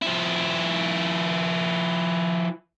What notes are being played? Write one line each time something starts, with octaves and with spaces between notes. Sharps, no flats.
F3 E4